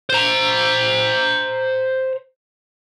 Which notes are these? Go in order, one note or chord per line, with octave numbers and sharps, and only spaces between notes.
C5 A#5